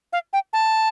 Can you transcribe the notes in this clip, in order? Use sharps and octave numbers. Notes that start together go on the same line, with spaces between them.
F5
G5
A5